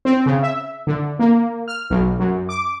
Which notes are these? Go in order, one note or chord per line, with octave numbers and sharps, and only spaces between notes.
C4
C#3
E5
D3
A#3
F6
B1
F#2
D6